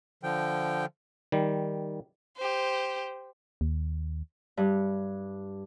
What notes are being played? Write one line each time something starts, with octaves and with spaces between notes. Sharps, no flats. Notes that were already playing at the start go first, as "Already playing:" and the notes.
D3 F3 G5
D#3 G3
G4 C5
D#2
G2